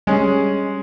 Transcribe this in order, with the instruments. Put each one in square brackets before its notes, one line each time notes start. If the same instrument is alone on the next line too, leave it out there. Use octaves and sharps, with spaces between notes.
[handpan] G3 [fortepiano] G#3 C#4